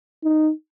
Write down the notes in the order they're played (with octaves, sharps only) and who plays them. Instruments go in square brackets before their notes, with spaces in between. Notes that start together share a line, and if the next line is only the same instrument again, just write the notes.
[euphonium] D#4